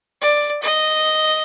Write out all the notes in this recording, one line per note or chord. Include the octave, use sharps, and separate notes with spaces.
D5
D#5